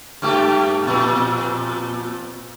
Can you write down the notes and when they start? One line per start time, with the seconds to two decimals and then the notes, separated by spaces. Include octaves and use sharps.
0.22 G2 A3 G4
0.83 F2 A#2